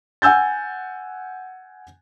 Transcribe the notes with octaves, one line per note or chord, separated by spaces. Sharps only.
F#5 G#5 E6 G6 A6